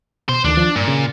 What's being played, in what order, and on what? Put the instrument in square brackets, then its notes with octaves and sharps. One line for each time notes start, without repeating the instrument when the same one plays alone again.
[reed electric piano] B2 [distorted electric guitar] C5
[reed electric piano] D2 D3 D#3 [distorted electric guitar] D4
[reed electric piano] F3
[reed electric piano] G2 [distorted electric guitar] A#2
[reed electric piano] C#3